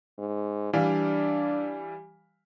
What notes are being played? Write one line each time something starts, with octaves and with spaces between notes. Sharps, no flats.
G#2
E3 G3 D4 F5